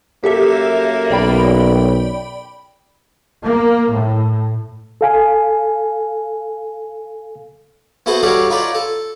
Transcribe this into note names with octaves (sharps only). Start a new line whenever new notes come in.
F#2 A#3 G4 A4 E5
B1 D5 G5 B5
A#3
A2
A4 F5 G#5
B3 E4 F#4 A4 B4 C5
G3 F#4 A4 C#5 D5 F5
D#4 F4 B4 C#5 D5
A4